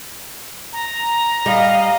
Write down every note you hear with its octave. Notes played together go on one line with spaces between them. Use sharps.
A#5
G3 D#5 F5